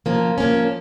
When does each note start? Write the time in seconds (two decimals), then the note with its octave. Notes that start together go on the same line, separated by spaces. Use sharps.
0.06 F3 A#3 C#4
0.38 F3 A#3 C#4